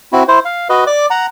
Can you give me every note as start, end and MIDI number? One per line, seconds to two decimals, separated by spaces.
0.13 0.23 60
0.13 0.23 64
0.13 0.23 66
0.28 0.39 64
0.28 0.39 72
0.45 0.68 77
0.69 0.84 66
0.69 0.84 71
0.69 0.84 75
0.87 1.06 74
0.87 1.06 86
1.10 1.26 78
1.10 1.26 82